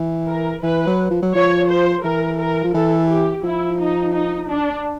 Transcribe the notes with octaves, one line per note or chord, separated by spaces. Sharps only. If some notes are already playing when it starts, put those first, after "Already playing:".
Already playing: E3
A#4
E3 B4
F#3
F3
F#3
F3 C#5
C5
E3 A#4
A#4
F3
E3 A4
G4
F3 E4
D#4
D#4
D4